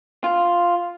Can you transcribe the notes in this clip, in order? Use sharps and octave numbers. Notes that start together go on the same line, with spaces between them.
F4